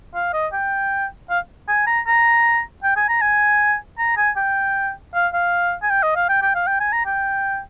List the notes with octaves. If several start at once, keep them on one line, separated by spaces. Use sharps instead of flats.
F5
D#5
G5
F5
G#5
A#5
A#5
G5
G#5
A#5
G#5
A#5
G#5
G5
F5
F5
G#5
G5
D#5
F5
G5
G5
F5
G5
G#5
A#5
G5